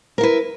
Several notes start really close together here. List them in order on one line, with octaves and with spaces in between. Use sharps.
A#4 E4 B4